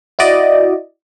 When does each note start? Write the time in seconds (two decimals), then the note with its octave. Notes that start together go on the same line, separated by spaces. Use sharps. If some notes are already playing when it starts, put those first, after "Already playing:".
0.19 E4 F#4 D5 D#5